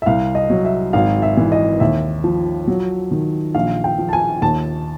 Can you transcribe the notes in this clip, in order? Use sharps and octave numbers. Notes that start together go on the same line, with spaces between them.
E5
C2 F5
D#5
F#3
E5
G#1 F5
E5
E3
D#5
D#2 E5
F3
F#3
D#3
A#1 F5
G5
F3
A5
G#5
D#2 A5